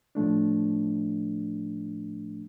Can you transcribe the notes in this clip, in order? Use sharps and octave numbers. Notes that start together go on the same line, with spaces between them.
A2 F3 A3 D4